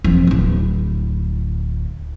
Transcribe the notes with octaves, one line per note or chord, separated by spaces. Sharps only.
F1 F3
D1 E4